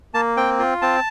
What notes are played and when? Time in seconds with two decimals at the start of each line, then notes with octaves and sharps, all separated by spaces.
0.14 A#3 A5
0.37 C4 G5
0.59 F4
0.82 C4 A5